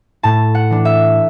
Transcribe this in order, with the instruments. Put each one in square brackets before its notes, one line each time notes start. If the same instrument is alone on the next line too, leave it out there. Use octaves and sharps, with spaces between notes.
[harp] A2 A5
F#5
E3 D4
E5